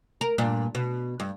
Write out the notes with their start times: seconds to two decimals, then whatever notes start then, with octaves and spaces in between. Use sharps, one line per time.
0.21 A#4
0.38 G2 A#2 D4
0.75 B2
1.20 G2